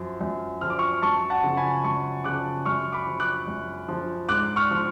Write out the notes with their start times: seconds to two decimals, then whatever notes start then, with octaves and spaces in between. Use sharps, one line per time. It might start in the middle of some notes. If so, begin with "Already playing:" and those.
Already playing: F#2 F3
0.21 F#2
0.61 F3 F6
0.70 D6
0.79 C#6 F6
1.02 F#2 A5 C#6
1.30 F#5 A5
1.43 C#3 F3
1.57 G#5 B5
1.84 F#2 A5 C#6
2.24 C#3 F3 D6 F#6
2.65 F#2 C#6 F6
2.92 B5 D6
3.07 F3
3.20 D6 F#6
3.48 F#2
3.88 F3
4.29 G#2 D6 F#6
4.56 C#6 F6
4.71 F3